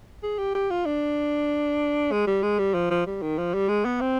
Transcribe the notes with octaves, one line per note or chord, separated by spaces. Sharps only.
G#4
G4
G4
F4
D4
G#3
G3
G#3
G3
F3
F3
G3
D#3
F3
G3
G#3
B3
C4